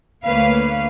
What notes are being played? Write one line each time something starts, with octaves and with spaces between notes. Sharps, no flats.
D2 A#3 B4 C#5 F5